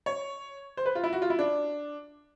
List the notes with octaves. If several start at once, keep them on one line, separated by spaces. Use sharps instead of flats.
C#5
C5
B4
F4
E4
F#4
F4
E4
D4